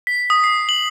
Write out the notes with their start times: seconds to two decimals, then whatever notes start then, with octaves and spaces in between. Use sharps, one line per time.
0.07 B6
0.30 D#6
0.44 C7
0.69 F#7